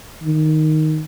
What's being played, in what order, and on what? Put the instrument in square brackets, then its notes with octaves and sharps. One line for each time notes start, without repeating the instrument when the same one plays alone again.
[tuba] D#3